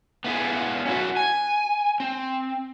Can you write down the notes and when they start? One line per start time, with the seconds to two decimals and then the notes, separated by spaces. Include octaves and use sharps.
0.24 B3 E4 F4 G#4
0.85 C#4 E4 F#4
1.17 G#5
2.00 C4